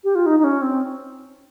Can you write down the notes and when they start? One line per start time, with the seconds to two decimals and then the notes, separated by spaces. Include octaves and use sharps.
0.04 G4
0.15 F4
0.26 D#4
0.39 D#4
0.44 C#4
0.62 C4